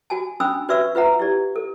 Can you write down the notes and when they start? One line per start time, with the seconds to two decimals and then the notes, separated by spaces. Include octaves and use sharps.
0.10 F#4 G#5 A5
0.40 C#4 D4 G#5 B5 D#6 E6
0.69 F#4 B4 D5 E5 C#6 E6
0.95 F4 B4 E5 F#5 A#5
1.19 E4 G4 D5
1.56 A4